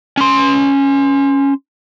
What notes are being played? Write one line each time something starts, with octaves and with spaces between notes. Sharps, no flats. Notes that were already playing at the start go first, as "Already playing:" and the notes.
C#4 C6